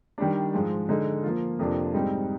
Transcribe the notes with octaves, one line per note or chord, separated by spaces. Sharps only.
D#3 G3 D4
G#2 F3 G#3
D3 G#3 D#4
F3 A#3 F4
F2 C3 F3 A#3 D4
G#2 G3 C4 D#4